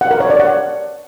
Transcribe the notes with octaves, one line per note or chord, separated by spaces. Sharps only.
F#5
A#4
C#5
D5
F#5